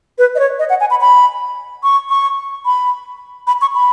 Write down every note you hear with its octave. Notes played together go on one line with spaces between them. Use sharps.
B4
D#5
C#5
D#5
F#5
G#5
B5
B5
C#6
C#6
B5
B5
C#6
B5